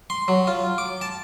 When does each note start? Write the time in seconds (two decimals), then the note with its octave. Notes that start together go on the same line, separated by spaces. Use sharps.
0.10 C6
0.28 F#3
0.47 F4
0.78 D6
1.01 A5